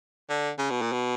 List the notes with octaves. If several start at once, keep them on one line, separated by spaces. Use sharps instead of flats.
D3
C#3
B2
A#2
B2